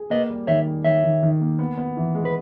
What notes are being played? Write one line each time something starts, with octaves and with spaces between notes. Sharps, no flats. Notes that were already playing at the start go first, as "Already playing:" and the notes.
Already playing: G#4
A#3 B4 D#5
G3
D#3 C#5 E5
G3
D#3 C#5 E5
D#3
D#3
A#3
B3
B3
E3
G#3
B4